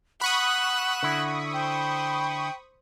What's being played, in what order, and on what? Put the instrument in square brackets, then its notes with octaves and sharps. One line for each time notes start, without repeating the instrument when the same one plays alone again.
[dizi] F#5 [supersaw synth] B5 C#6 D#6 [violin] E6 F#6
[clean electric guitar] D3 E4
[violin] C5 [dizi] G5